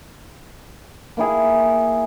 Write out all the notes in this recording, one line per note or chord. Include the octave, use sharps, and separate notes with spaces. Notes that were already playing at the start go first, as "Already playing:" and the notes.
A#3 E4 G#4